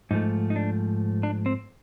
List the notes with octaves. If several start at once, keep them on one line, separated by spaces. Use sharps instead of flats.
G#2 F3 A3 D#4
D#4
D4
D4
C4